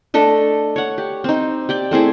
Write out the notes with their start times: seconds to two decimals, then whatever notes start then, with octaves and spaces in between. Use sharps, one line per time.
0.14 A3 D4 A4 D#5
0.76 C#5 F#5
0.98 G4
1.24 C4 D#4
1.69 G4 D5 G5
1.91 A3 C4 E4 G#4